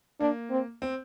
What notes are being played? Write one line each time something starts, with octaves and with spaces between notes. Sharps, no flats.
A#3 D4
C4
C4